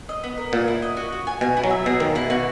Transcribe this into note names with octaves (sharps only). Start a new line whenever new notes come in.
D#5
B3
A#4
A#2 F#5
E4
D#5
F#4
F#4
G#5
B2 G#5
E4
F#3
E5
B2 G#4
D#3 A#3
B2 E4
B2 F#4